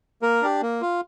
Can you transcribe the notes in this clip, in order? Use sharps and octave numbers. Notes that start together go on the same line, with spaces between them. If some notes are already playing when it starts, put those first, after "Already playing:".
A#3 A#4
D4 G4
A#3
F4